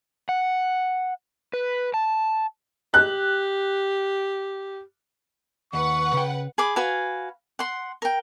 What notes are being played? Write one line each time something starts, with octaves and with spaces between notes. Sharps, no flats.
F#5
B4
A5
G4 F#6
D#2 B4 F#5 C#6
C#3 G5
G#4 B5 D6
F#4 B4 F5 G#5
F#5 C6
A#4 G5